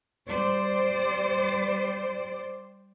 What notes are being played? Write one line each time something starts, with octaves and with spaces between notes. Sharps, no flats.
G3 C5 D5